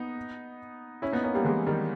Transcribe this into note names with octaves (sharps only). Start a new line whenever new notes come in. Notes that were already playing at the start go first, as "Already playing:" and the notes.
Already playing: B3 D#4
C#4 E4
B3 D#4
A#3 C#4
G3 A#3
E3 G#3
D#3 G3